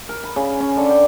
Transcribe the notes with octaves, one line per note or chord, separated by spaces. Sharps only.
A#4
B5
C#3
C#4
D3
G5